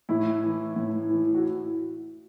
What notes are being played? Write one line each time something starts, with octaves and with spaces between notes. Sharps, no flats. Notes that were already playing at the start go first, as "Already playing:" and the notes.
A2 E4
E3
A2
E3
F#4